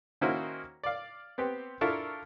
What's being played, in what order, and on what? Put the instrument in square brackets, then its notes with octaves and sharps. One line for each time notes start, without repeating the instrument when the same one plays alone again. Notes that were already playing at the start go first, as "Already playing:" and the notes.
[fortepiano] D#3 A#3 C#4 E4 F#4 C5
D5 F5
B3 C4 G4
D4 E4 F4 A4 A#4 C#6